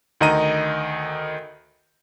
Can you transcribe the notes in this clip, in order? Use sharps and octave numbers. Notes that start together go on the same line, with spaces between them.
D2 D#3 D#5 A#5 D#7